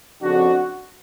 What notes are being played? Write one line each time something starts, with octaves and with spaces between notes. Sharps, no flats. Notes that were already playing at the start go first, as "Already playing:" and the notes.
F2 C#3 D4 F#4